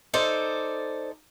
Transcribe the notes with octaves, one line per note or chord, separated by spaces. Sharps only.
D#4 A4 C5 D5